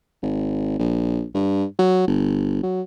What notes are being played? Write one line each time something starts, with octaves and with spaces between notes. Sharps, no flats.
G#1
A#1
G2
F#3
G1
F#3